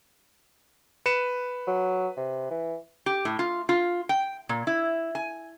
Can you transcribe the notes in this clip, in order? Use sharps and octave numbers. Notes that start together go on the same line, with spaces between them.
B4 C#7 E7
F#3
C3
E3
G4
A2
F4
F4
G5
A#2
E4
G#5